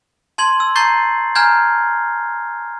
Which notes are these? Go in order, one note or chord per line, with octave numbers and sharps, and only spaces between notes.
A5 C6 G#6 F#7
E6
A5 A#5 C#6 G6 A6 C7
G#5 A#5 F6 G6 G#6